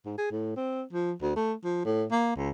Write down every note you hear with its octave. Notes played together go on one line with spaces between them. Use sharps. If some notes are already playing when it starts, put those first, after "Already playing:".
G#2
G#4
A2
C4
F3
D2
A3
F3
A2
A#3
C#2